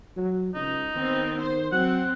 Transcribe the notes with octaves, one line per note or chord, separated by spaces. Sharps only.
F#3
C#2 D#4
D#3 B3 C4
C5
F#3 C4 F#5